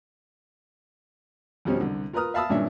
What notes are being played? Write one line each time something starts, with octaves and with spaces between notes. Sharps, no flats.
F2 B2 F3 G3 C#4
C2 D3
F4 A#4 B4 A#5 D#6 F6
E5 F5 A5 B5 D#6 E6
G#1 G2 A#2 C#4 D4 E5